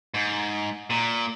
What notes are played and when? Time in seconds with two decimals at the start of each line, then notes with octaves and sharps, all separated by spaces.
0.14 G#2
0.90 A#2